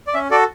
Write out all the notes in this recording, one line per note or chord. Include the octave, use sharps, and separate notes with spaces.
D5
C#4 E5
F#4 A4 D5